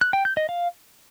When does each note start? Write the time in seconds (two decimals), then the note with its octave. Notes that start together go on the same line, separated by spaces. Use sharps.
0.01 F#6
0.13 G5
0.25 G6
0.37 D#5
0.49 F5